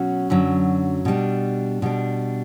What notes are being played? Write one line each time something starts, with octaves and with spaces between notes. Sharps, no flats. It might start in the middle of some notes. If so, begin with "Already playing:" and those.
Already playing: B2 F#3 C#4 F#4
F#2 D3 F#3
B2 G3 D4
B2 G3 D4